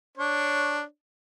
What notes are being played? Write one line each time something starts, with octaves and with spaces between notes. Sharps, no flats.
D4 C#5